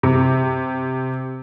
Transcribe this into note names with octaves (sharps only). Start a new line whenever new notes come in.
C3